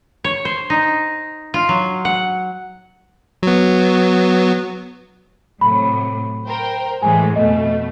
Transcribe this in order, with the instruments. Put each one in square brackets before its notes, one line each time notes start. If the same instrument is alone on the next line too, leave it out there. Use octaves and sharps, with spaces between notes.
[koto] C#5
C5
D#4
F4
F#3
F#5
[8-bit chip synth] F#3 B3
[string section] A2 C3 F#3 [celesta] B5
[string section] A#4 C5 G5
[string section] A2 E3 G#3 [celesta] G#5
[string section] F2 B2 A3 [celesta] D#5